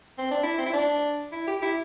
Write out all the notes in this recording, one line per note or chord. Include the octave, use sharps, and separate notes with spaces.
C4
D4
E4
C4
E4
D4
E4
G4
E4